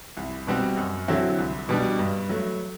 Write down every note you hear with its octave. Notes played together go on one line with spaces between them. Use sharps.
C2
B2 G3 C4 F#4
F#2
D3 F#3 C4 E4
C2
B2 G3 D4
G2
F#3 A3